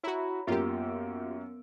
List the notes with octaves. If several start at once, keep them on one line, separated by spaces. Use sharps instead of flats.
E4 F#4 C#5 A#5 B5
F#2 A#3 B3 F4 G4 E6 D7